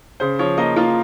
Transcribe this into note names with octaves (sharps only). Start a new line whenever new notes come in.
C#3 C5
F3 C#5
A#3 D#5
A#3 F4